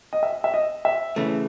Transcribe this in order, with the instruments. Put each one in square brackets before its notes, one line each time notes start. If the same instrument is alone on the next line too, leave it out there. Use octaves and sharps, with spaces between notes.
[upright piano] D#5
E5
E5
D#5
E5
[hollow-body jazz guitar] C#3 E3 A3